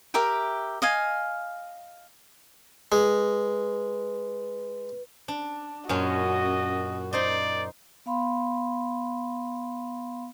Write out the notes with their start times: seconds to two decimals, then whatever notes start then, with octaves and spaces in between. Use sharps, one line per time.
0.14 G4 A#4 E5 G5
0.82 D#5 F5 G#5
2.92 G#3 B4
5.28 D4
5.89 F#2 A#2 C#4 F#4 D#5
7.13 D#4 C5 D5 D#5
8.06 B3 F5 B5 C6